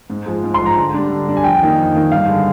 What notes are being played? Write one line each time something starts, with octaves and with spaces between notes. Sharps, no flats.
G#2
F3 G#3
G#2
C6
F3 G#3
A#5
D3
G3 D4
D3
G3 D4
G#5
F2 G5
D#3 A#3 D#4
F2
D#3 A#3 D#4
G2 F5
D3 G#3